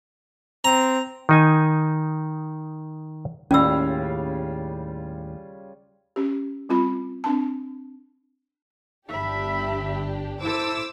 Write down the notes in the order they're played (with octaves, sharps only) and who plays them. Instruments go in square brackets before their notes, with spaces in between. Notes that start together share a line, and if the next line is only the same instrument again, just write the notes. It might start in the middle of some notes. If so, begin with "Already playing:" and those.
[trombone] C4 [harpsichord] A#5
[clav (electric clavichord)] D#3 D#4 G#5
[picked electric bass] D#2 A2 [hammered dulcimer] C#3 G3 F4 [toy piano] C#4 E6
[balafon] C#4 G4
G3 C4 F4 B5
C4 D4 A5
[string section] G1 D4 G4 [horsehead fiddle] E5 B5
[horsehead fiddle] E4 A4 [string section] C5 D6 E6